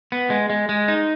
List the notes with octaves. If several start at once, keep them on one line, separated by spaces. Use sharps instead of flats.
B3
G#3
G#3
G#3
D#4